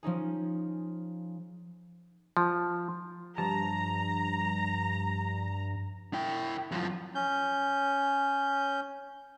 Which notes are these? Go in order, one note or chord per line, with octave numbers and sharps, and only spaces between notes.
F3 C#4 D#4 G#4
F3
G2 F3 A5 A#5
E4 G5
F#2 F3
C#4 G6